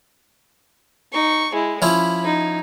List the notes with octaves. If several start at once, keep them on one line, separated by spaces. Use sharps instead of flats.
D#4 C#6
G#3 E4
F3 C#4 E4 B5
D#4